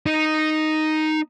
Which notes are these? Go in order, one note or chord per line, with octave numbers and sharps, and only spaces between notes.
D#4